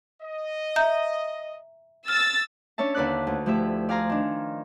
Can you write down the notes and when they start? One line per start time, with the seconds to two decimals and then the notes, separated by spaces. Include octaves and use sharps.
0.21 D#5
0.76 E5 A#5 G6
2.08 E6 F6 A6
2.78 C#4 D4 C#5 E5 A5
2.94 D#2 D3 B4 D5 D6 F#6
3.27 D2
3.46 F3 A3 E4 G4 E5
3.89 D5 F5 G#5 A#5 C6
4.10 D#3 D4